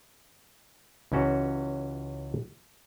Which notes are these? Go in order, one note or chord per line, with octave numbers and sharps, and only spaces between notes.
C#2 E3 C#4 F#4